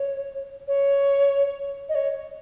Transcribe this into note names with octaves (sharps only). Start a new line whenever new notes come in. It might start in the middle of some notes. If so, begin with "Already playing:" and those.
Already playing: C#5
C#5
D#5
C#5